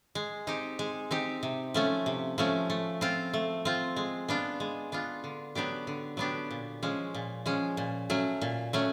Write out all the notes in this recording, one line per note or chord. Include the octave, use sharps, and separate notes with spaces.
G#3
C4 D#4 G4
G#3
C4 D#4 G4
C3
F3 A3 C#4
C3
F3 A3 C#4
A3
C4 F4
A3
C4 F4
G#3
B3 D4 F4
G#3
B3 D4 F4
D3
F#3 B3 D4 G4
D3
F#3 B3 D4 G4
A#2
F3 G#3 C#4
A#2
F3 G#3 C#4
A#2
F#3 A3 C#4
A#2
F#3 A3 C#4